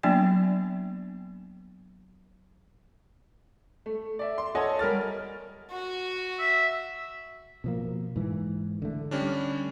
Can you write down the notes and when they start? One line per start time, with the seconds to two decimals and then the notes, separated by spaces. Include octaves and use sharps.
0.03 F#3 A#3 B3 D4 D5 G5
3.86 A3
4.19 D5 E5
4.38 C6
4.55 A4 C#5 D#5 F#5 G#5 A5
4.79 G3 A#4 F6 A6
5.71 F#4
6.39 E5
7.64 B2 F3 A#3
8.16 G#2 E3
8.82 D3 A3
9.11 G3 C#4 D4